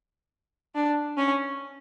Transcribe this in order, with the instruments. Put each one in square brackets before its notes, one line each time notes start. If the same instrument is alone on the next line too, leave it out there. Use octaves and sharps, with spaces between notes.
[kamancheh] D4
C#4